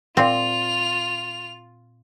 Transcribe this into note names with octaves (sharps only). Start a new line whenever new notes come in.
A#2 C4 F4 F7